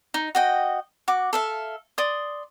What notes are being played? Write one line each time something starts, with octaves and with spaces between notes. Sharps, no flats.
D#4
F#4 D#5 G5
F#4 D6
A4 E5 F5
D5 C6 D#6